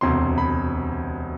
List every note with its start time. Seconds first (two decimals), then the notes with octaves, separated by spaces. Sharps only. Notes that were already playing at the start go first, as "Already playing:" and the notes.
0.01 E1 D2 C3 C6
0.38 B5